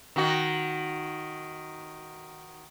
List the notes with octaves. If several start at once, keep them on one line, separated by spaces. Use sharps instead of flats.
D#3 F#4